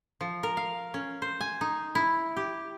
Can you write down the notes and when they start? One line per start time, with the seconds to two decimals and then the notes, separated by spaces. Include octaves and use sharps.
0.21 F3
0.43 A#4
0.57 F5
0.94 C#4
1.22 C5
1.41 G#5
1.61 D#4
1.95 E4
2.37 G4